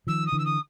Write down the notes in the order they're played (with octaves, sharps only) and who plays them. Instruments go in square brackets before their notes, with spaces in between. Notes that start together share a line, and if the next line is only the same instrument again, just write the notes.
[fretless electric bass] D#3 F3 [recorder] E6
[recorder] D#6
[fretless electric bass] D3 E3
[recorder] E6
D#6